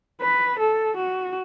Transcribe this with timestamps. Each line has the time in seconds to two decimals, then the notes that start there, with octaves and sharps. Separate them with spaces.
0.22 B4
0.59 A4
0.97 F#4